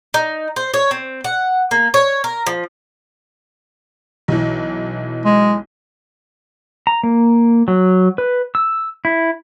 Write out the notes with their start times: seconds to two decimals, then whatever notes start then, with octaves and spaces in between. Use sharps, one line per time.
0.14 D#4
0.56 C5
0.74 C#5
0.91 C4
1.24 F#5
1.71 A#3
1.94 C#5
2.24 A#4
2.47 F3
4.28 B1 E3
5.25 G#3
6.87 A#5
7.03 A#3
7.68 F#3
8.18 B4
8.55 E6
9.05 E4